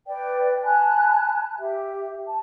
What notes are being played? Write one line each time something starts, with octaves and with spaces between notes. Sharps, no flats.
B4 D5 G5
G#5 A5 B5 F#6
G4 E5
A5